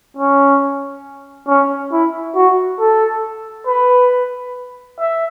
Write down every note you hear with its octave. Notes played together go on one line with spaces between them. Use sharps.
C#4
C#4
E4
F#4
A4
B4
E5